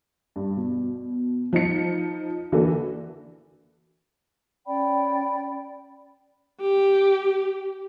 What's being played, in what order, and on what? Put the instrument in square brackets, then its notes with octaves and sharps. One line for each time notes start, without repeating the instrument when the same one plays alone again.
[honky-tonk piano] G2
B2
F3 D#4 C#7
D3 E3 A#3 F#4 A4
[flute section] C#4 D5 G5 B5
[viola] G4